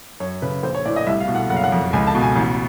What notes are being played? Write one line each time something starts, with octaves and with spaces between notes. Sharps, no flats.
F#2 C#5
C#3 B4
A#1 C5
C#5
A2 D5
D#5
C2 E5
F5
B2
F#5
F#1 F#5
F5
F#5
F2
C#2 G#5
A5
B2
G#5
A1